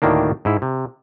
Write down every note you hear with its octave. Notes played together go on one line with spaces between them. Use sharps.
D2 A2 D#3 A#3 D4
G#2 E4
C3